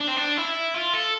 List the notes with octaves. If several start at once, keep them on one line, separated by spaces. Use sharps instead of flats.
D4
C4
D4
E4
F4
A4